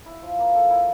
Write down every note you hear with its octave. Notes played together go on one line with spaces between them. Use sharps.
E4
F3
A#3
A4
E4